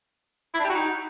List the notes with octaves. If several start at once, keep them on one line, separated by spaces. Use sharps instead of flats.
E4
D4
G4
F#4
D#4